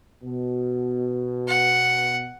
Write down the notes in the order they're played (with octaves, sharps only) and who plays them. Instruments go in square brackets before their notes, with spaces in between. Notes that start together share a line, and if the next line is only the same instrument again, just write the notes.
[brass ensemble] B2
[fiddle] F#5